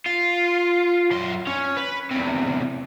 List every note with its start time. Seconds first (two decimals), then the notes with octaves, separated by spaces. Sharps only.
0.06 F4
1.11 F#2 C6
1.47 C#4
1.77 B4
2.11 E2 C3